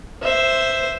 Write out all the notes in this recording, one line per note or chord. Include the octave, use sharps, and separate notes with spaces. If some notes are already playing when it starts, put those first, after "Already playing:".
C5 E5